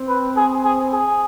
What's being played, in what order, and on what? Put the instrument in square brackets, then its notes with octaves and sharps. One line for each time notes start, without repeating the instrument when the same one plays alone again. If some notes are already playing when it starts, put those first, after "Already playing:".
Already playing: [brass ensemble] C4
[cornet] B4
G#4
G#4
G#4